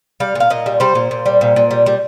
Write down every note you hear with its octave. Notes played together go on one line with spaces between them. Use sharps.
G3 F5
A#2 F5
A#2 D#5
G3
G3 C5
A#2
A#2
G3
A#2
A#2
G3
G3